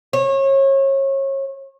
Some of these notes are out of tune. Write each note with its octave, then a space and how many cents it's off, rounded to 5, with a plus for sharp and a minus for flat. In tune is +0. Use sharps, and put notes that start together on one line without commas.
C#5 -30